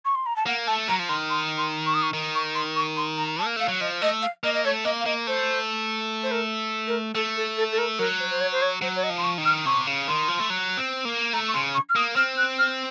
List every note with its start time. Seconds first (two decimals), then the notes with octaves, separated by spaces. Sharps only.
0.05 C#6
0.15 C6
0.26 A#5
0.36 A5
0.46 A#3 F#5
0.67 A3 A5
0.88 F#3 A#5
0.99 F3
1.08 D#3 C6
1.30 C6
1.58 C6
1.86 C#6
1.94 D#6
2.03 C#6
2.13 D#3
2.34 C#6
2.55 C6
2.76 C#6
2.97 C6
3.18 A#5
3.39 A5
3.44 A#3
3.56 A3 F5
3.68 F#3
3.80 F3 D#5
4.02 A3 D#5
4.22 F5
4.44 A#3 D#5
4.54 D#5
4.65 A3 C#5
4.85 A#3 D#5
5.00 F5
5.06 A#3 D#5
5.27 A3 C5
6.23 C5
6.31 A#4
6.87 A#4
7.14 A3 A4
7.36 A4
7.57 A4
7.72 A4
7.78 A#4
7.98 F#3 A#4
8.20 C5
8.30 C5
8.40 C#5
8.52 C5
8.61 C#5
8.82 F#3 C5
8.96 C#5
9.03 D#5
9.10 F3
9.18 C6
9.23 C#6
9.38 D#3
9.45 F6
9.66 C3 C#6
9.87 C#3
10.08 D#3 C6
10.28 F3
10.39 A3
10.50 F#3
10.77 C4
11.05 A#3
11.33 A3 A#5
11.48 C#6
11.54 C#3 C6
11.74 C#6
11.89 F6
11.96 A#3 D#6
12.16 C4 F6
12.37 F#6
12.58 F6